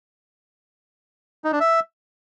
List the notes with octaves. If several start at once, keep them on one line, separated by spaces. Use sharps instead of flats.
D#4
D4
E5